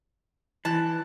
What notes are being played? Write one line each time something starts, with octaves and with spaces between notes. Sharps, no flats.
E3 A5 F#6